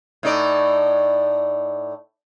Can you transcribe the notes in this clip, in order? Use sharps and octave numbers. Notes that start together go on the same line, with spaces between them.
A2 D#4 D5